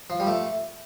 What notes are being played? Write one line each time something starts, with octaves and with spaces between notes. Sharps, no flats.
F3
G3
A3